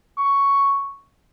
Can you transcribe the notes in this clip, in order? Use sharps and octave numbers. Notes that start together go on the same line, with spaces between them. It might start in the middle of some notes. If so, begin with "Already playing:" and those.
C#6